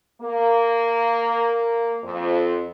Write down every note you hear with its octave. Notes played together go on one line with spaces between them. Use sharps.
A#3
F2